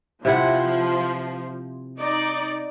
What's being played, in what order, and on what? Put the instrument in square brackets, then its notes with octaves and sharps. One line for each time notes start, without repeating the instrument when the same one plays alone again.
[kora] C3 E4 F#5 [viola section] F3
[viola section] D#4 D5